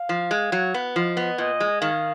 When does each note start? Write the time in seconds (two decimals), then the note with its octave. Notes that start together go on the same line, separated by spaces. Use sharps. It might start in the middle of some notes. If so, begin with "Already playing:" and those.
Already playing: F5
0.09 F3
0.31 G#3
0.52 F#3
0.74 B3
0.96 F3 D#5
1.17 B3
1.38 A#2 D#5
1.60 G#3
1.82 D#3 F5